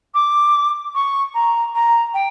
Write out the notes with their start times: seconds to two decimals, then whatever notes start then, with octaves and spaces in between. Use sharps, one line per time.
0.14 D6
0.94 C#6
1.34 A#5
1.75 A#5
2.14 G5